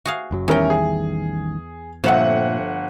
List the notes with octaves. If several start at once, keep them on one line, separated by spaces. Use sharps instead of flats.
F#4 G#4 F5
F#1 F#2 F#3
A1 E2 D#3 G3 C#4 A#4 G5
G#4
G1 A#2 F3 A3 C4 F#5